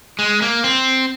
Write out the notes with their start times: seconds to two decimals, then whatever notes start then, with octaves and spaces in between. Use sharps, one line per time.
0.19 G#3
0.42 A#3
0.64 C4